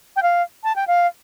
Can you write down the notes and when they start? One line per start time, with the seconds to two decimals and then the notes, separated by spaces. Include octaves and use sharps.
0.16 G5
0.23 F5
0.64 A5
0.76 G5
0.87 F5